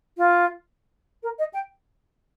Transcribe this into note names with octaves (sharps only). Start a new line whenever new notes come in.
F4
A#4
D#5
G5